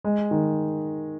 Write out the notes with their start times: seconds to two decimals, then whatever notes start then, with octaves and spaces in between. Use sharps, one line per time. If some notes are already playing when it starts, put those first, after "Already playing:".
0.04 G#3
0.31 D#3